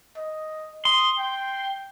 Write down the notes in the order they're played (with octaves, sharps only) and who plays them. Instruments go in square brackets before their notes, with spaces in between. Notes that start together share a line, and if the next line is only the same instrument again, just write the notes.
[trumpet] D#5
[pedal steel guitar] C6 [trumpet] D#6
[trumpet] G5